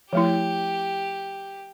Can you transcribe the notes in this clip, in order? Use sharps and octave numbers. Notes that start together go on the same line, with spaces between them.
F3 A3 E4 G4